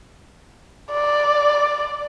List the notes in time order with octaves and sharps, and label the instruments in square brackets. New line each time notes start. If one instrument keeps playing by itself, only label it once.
[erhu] D5